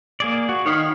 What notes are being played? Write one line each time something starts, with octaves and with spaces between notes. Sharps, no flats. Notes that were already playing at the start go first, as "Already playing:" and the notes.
A#3 G#4 D5
F#4
D#3 C#5 F5 B5